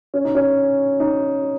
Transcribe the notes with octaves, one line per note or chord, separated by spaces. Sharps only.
C#4
D#4
C#4
D#4